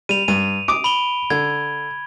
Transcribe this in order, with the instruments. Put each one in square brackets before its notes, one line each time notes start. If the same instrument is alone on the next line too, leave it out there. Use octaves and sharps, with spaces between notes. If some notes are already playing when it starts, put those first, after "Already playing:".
[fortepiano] G3 [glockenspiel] D#7 F7
[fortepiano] G2 [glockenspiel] D#7
[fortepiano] D6 D#6 [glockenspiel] D7
[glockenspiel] B5 F7 G7
[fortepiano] D3 [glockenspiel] G#6